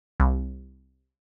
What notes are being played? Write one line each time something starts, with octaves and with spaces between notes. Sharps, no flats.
C2